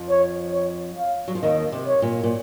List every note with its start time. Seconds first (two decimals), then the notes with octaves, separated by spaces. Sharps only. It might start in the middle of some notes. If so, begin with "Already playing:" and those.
Already playing: F2 F3
0.10 C#5
0.54 C#5
0.99 F5
1.28 F#3
1.35 F3
1.43 D#2 D#3 D#5
1.72 C3
1.88 C#5
2.02 A#2
2.24 A#2